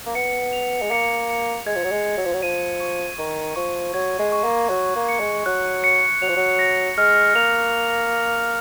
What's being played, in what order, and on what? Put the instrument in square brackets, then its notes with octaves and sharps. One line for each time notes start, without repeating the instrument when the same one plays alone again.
[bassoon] A#3
[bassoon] B3 [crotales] C#7
[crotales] F7
[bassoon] G#3
[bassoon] A#3 [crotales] C#7
[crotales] C#7
[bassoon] G#3 [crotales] G#6
[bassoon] F3
F#3
G#3
[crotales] G#6
[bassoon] F#3
F3
F#3
[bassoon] F3 [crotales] D#7
[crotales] C#6
[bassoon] D#3 [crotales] C#6
[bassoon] F3 [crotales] C#6
[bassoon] F#3 [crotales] G#6
[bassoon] G#3
[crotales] C#6
[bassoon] A#3
[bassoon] F#3 [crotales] F#6
[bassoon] A#3
[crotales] C#7
[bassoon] G#3
[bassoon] F#3 [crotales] F#6
[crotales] C#7
[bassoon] F#3 [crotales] F7
[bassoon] F3
F#3
[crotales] A#6
[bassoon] G#3 [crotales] F6
[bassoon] A#3 [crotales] F7